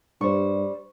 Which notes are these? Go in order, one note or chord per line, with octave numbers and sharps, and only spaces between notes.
G2 G3 C5 C#6